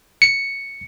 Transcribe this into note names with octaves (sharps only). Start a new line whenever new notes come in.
C#7